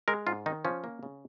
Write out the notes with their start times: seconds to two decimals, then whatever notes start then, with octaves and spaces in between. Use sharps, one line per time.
0.08 G#3 A#4
0.27 G#2 F4
0.46 D#3 D#4
0.65 F3 C#4
0.84 A#3
1.03 C#3